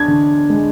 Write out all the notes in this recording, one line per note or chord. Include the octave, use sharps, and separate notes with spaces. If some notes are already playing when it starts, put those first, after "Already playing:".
Already playing: D4 G#6
D3
G#3